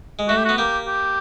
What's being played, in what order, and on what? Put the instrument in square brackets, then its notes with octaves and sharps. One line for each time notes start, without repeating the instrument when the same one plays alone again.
[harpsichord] G#3
[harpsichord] A3 [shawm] F#4
[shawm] G4
F#4
[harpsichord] B3
[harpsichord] A#3 [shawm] G4
[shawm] G4